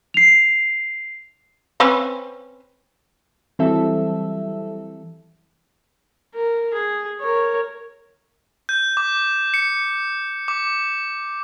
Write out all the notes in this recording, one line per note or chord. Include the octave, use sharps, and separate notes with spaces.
C7 F7
C4 C#4 B4
E3 F#3 G3 C4 A4 E5
A#4
G#4
A#4 C#5
G6
D6
C#7
D6